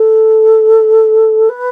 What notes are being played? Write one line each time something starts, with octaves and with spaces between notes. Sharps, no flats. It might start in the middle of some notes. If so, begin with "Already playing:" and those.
Already playing: A4
B4